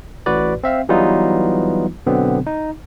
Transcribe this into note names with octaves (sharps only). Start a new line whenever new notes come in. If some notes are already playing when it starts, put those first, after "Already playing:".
A1 A2 F#4 B4 D5
C4 E5 F5
E3 F#3 G3 B3 D#4 F4
B2 D3 F#3 B3 C4
D#4